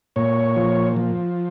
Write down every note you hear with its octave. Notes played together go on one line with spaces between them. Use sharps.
A#2 C#5
F3
F3